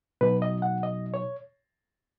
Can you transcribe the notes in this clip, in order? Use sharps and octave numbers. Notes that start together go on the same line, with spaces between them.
B2 F#3 D#4 B4
D#5
F#5
D#5
C#5